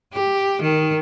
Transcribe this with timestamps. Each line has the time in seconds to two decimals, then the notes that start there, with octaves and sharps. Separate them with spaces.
0.13 G4
0.60 D#3